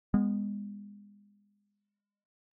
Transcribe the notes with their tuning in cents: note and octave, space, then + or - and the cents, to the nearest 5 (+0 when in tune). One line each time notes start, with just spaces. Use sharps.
G#3 -30 B3 +0